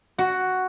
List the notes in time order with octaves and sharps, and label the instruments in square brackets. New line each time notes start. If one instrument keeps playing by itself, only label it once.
[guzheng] F#4